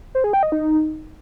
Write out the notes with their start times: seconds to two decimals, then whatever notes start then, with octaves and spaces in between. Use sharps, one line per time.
0.15 C5
0.24 G#4
0.33 G5
0.43 D#5
0.52 D#4